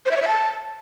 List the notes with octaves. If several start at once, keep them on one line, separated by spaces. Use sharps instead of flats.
C5
E5
C#5
E5
A5